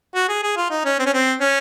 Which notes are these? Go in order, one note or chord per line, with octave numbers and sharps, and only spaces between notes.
F#4
G#4
G#4
F4
D#4
C#4
C4
C#4
C4
C#4